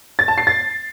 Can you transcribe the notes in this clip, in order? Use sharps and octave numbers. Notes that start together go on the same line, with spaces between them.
A6
A5
C7
A6